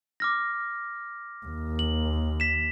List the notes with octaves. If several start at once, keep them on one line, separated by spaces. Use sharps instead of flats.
D6 F6 A#6
D#2
F#7
B6 E7